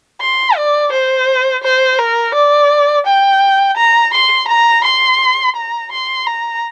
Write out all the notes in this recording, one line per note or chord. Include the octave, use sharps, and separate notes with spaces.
C6
D5
C5
C5
A#4
D5
G5
A#5
C6
A#5
C6
A#5
C6
A#5